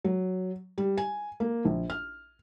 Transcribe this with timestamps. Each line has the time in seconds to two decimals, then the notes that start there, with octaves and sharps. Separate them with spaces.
0.05 F#3
0.78 G3
0.98 G#5
1.40 A#3
1.65 A#1
1.90 F6